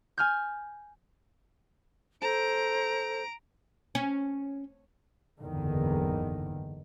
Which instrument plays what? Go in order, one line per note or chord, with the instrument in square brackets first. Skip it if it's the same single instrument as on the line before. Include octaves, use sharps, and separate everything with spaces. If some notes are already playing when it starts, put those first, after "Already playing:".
[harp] G#5 F6 G6
[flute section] A4 C5 [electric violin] A#5 D7
[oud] C#4
[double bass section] F#1 E2 G#2 D3 D#3